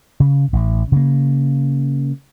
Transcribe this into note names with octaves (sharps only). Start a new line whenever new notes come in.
C#3
A1
C#3 A#3